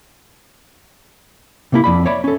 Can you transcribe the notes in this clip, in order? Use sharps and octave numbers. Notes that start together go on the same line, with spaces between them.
C3 A#3 E4
F2 D5 B5
C#5 D5 E5 B5
C#4 A4